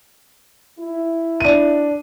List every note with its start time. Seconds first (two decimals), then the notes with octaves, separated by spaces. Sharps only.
0.79 E4
1.40 D4 D#7